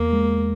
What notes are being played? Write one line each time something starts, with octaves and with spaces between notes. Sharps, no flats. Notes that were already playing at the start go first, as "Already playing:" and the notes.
Already playing: E2 A#3
G#3